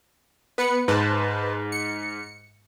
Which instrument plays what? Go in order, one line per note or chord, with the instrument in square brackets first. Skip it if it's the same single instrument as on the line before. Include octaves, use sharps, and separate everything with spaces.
[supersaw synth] B3 B4 C#7
[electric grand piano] G#2 [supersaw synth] B4 C5 A5
[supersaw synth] C#7